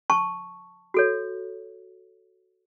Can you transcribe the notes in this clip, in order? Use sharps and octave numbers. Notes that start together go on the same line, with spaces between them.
A5 C#6
F#4 A4 C#5